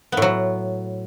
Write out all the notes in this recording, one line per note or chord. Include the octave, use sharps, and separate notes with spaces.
A2 F#3 B3